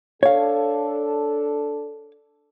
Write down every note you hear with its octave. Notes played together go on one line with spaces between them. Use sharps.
D4 A4 C#5 F5